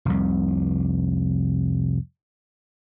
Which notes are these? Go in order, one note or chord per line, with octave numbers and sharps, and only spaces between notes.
F1 C2